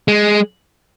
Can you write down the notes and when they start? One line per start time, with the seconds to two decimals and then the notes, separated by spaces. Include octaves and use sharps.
0.08 G#3